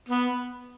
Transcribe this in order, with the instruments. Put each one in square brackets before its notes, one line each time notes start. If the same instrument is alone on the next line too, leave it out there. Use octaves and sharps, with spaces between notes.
[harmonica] B3